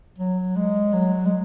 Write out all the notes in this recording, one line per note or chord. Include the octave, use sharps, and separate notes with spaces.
F#3
G#3
F#3
G#3